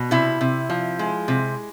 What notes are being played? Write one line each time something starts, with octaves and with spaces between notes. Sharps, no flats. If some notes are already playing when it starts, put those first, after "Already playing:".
Already playing: B2
C3 E4
C3
F3
G#3
C3